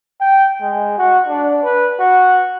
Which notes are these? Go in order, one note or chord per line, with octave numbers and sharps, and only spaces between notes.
G5
G#3
F#4
D4
B4
F#4